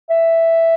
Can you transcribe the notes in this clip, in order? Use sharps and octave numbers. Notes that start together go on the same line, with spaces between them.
E5